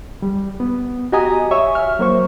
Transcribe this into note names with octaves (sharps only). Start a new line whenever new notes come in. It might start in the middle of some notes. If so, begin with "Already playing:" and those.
G3
B3
F#4 G4 D#5 G#5 A#5 D#6
C#5 E5 G#5 C#6
E5 F6
F#3 A#3 C5 C#6